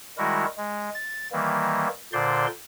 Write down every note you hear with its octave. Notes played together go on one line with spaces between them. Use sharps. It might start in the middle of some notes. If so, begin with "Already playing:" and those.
D#3 G3 G#3 E4 F#4 A#4
G#3
A6
D#3 E3 G3 A#3
A#2 D3 C5 D5 C6